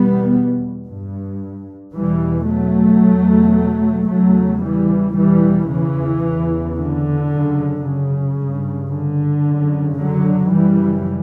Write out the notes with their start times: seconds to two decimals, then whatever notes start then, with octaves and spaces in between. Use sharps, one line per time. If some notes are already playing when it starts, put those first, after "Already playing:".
Already playing: E2 B2 G3 B3
0.87 G2
1.94 E2 B2 E3 G3
2.48 F#3 A3
3.02 E2 B2
4.09 E2 C#3 F#3 A3
4.62 E3 G3
5.16 E2 B2 E3 G3
5.69 C#3 E3
6.24 E2 C#3
6.76 D3
7.30 F#2 C#3
7.84 C#3
8.38 G2
8.91 D3
9.45 F#2 C#3
9.98 D3 F#3
10.52 F#2 C#3 E3 G3